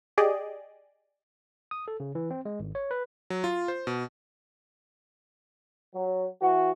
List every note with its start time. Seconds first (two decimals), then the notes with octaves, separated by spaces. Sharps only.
0.18 G4 G#4 D5 D#5
1.71 D#6
1.88 A4
2.00 C#3
2.15 E3
2.31 C4
2.45 G#3
2.60 G#1
2.75 C#5
2.91 B4
3.30 F#3
3.44 F4
3.68 C5
3.87 B2
5.93 F#3
6.41 E3 F#4